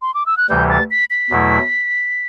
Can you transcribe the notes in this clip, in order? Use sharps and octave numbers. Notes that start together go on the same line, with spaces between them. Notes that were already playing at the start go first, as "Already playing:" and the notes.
C6
D6
E6
F#6
D2 C3 E3 G3 G6
A6
B6
B6
E2 B2 F#3 A3 E4